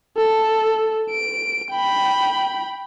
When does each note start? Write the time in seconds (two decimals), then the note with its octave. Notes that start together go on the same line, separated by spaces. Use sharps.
0.18 A4
1.11 D7
1.71 G5 B5